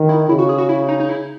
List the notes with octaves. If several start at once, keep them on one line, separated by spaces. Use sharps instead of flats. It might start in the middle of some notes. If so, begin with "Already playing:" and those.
Already playing: D#3
E4
C#3 E4
F#4
G#4
F#4
E4
D#4
D#4
E4